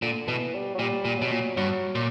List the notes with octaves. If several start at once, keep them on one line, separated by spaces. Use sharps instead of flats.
A#2 D3
B2 E3
G3
F#3
A#2 G3
A#2
B2 F#3
A#2
G2 F#3
A#2